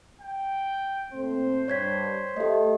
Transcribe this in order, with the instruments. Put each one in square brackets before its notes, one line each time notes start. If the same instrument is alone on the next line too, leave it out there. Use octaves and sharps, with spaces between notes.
[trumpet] G5
[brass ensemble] A#2 A3 C4 [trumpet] C5
[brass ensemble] G2 [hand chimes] C#5 G#6 B6
[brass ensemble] A3 [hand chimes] G4 D#5